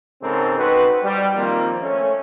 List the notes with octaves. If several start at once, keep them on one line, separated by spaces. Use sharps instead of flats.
G#2 C#3 C4 A4 A#4
C4 D#4 F#4 B4
G3
D#3 F3 A#3 C4 F4
A3 C#4